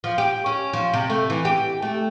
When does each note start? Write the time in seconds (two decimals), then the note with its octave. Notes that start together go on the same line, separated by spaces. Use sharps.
0.04 F3
0.18 G4
0.46 C#4
0.73 F3
0.94 C3
1.10 A3
1.30 E3
1.45 G4
1.82 A3